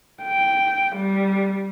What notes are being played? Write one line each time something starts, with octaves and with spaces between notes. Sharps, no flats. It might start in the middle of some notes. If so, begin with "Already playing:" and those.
G5
G3